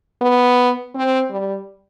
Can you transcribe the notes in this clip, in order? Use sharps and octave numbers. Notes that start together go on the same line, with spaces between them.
B3
C4
G3